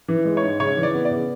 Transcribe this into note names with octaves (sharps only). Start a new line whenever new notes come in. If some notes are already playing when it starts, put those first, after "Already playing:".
E3
G#3
C#5
G#2
C#3 C#5
E3
D5
B3
D5
C#3